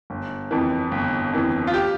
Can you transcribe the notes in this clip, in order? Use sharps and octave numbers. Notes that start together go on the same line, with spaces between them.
G1
F2 E3
G1
F2 E3
F4
G4